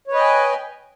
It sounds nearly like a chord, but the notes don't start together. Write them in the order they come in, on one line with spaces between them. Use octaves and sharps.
C#5 B4 D#5 G5 G#5